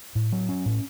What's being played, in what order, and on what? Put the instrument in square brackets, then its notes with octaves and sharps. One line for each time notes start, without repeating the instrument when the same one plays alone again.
[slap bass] A2
F#3
C#4
A2